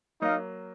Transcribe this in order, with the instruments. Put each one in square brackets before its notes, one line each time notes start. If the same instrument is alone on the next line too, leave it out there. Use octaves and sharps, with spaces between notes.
[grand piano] F#3 A#3 [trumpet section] D#4 A#4 F5